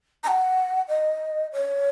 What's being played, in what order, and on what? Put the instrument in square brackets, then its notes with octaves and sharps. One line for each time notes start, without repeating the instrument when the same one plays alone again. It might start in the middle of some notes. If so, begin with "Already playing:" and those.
[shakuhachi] A#5
F#5
D#5
C#5